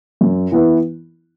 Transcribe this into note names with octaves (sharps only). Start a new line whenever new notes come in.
F#2
E3 B3 E4